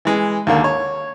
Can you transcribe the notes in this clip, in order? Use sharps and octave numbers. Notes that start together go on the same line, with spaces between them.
E3 G#3
D#2 D3 A#3
C#5